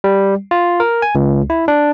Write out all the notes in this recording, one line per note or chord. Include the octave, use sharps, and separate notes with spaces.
G3
F4
A#4
G#5
C#2
E4
D4